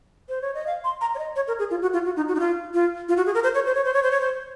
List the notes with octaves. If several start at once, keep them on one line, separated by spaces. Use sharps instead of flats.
C5
C#5
D#5
F5
C6
A#5
C#5
D#5
C#5
A#4
G#4
F4
F#4
F4
F#4
D#4
F#4
D#4
F4
F4
F4
F#4
G#4
A#4
C5
C#5
C5
C#5
C5
C#5
C5
C#5
C5